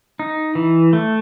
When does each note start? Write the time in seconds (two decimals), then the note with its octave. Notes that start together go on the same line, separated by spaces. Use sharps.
0.19 D#4
0.55 E3
0.93 A3